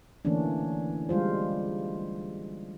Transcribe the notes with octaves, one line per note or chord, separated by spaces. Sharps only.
D3 E3 A3 A#3 C#4 D4
G3 G#3 F4 C5